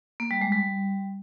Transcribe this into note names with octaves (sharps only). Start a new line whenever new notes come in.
A#3
G3
G#3
G3